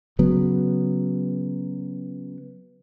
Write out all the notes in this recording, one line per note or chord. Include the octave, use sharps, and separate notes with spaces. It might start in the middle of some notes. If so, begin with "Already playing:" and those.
C#3 F#3 B3